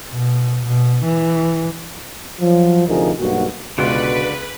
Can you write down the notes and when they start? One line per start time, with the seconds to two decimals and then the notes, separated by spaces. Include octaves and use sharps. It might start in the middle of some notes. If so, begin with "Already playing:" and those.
0.12 B2
0.66 B2
1.05 E3
2.41 F3 F#3
2.88 D2 C3 F3 D#4 G#4 A#4
3.19 B1 G2 A#3 F#4
3.78 C#2 B2 D3 F4 F#4 B4 D5